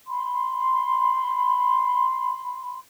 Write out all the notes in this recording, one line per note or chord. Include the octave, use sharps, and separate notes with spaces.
B5 C6